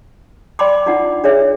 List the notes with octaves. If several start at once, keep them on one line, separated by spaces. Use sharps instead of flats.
D5 G5 B5 C6 D6
D4 D#4 F4 F#5
D4 G#4 C#5 E5